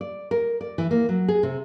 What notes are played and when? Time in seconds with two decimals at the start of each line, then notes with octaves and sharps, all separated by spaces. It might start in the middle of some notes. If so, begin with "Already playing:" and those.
0.01 D5
0.31 A#4
0.61 D5
0.78 E3
0.91 A#3
1.09 F#3
1.28 G#4
1.43 C3